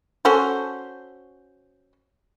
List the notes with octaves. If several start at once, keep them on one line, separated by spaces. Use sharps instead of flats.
C#4 F#4 A4 C5